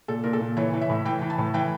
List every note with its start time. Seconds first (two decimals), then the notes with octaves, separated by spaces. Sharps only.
0.08 A#2 A4
0.23 A#2 A#4
0.33 A4
0.41 A#2
0.57 E3 C#5
0.73 E3
0.81 E5
0.89 A2
1.05 E3 G5
1.22 E3
1.30 A5
1.38 A2
1.54 E3 G5